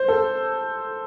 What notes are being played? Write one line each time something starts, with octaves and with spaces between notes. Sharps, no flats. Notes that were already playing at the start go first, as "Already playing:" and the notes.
Already playing: C5
A4